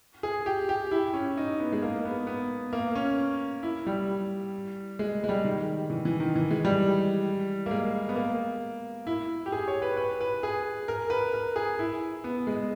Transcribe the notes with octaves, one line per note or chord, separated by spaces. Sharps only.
G#4
G4
G4
E4
C#4
D#4
B3
G#3
A#3
B3
B3
A#3
C#4
E4
G3
G#3
G#3
G3
D#3
E3
E3
D#3
E3
G#3
G3
A#3
G#3
B3
A#3
E4
G4
G#4
C#5
B4
B4
B4
G#4
A#4
B4
A#4
G#4
E4
B3
G#3